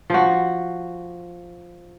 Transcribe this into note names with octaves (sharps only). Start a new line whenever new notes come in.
F3 F#4